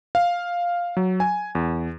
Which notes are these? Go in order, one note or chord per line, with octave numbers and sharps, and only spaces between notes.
F5
F#3
G#5
E2